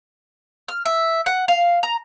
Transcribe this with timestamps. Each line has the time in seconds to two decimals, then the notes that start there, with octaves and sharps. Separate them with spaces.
0.68 F6
0.85 E5
1.26 F#5
1.48 F5
1.83 A#5